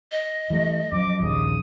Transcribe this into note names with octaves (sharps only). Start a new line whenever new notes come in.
D#5
E3 G3 A3
F#2 F3 D6
A#1 D#2 C#3 D#6